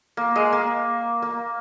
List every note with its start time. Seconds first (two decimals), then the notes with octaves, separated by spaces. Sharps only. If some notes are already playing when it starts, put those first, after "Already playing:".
0.17 A#3
0.36 G#3
0.52 A#3
1.22 A#3